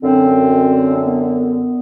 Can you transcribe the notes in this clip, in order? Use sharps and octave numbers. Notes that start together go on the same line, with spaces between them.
F#2 D3 C4
C4
B3